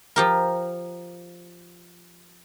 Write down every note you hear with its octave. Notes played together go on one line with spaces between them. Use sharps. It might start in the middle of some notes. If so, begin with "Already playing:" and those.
F3 G4 A#4